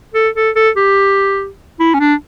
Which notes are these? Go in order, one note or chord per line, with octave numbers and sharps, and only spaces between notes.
A4
A4
A4
G4
E4
C#4
D4